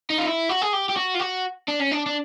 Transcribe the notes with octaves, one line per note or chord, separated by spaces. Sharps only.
D#4
F4
E4
F#4
G#4
G4
G4
F#4
F4
F#4
D4
C#4
D4
D4